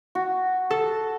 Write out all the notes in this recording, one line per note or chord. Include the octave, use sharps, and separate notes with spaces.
F#4
A4